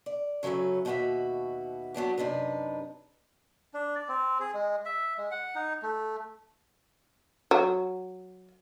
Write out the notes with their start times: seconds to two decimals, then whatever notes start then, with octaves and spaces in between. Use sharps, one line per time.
0.06 D5
0.43 C#3 F#3 A3 C#4 B4
0.85 D#2 B2 F4 F#4 B4 E5
1.94 F#3 B3 D4 G4
2.18 F#2 C3 D4 D#4 B4
3.74 D4
3.95 D5
4.08 C4
4.40 G#4
4.54 G#3
4.85 E5
5.18 G#3
5.31 F#5
5.56 D#4
5.83 A3
7.51 F#3